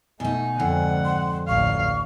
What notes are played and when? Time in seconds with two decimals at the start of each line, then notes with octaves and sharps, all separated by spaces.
0.20 B2 A3 D#4 G#5
0.60 F2 G#2 D3 F#5
1.05 C6
1.48 A1 D2 F5 C#6